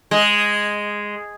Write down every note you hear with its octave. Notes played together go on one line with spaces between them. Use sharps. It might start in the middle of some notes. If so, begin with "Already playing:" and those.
G#3